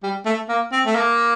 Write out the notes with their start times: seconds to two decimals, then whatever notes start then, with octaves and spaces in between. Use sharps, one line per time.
0.03 G3
0.25 A3
0.49 A#3
0.72 C4
0.86 A3
0.95 A#3